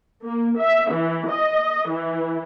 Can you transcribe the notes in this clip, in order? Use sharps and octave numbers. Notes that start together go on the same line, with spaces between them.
A#3
E5
E3
D#5
E3